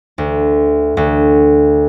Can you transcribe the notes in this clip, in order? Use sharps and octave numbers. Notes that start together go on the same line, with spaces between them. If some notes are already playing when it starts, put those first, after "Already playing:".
D2
D2